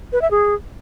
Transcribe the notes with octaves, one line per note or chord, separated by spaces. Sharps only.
B4
E5
G#4